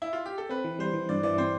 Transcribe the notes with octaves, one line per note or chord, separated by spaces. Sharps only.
E4
F4
G4
A4
C4 B4
E3
G3 C5
E3
G2 D5
E3 D5
C4 C5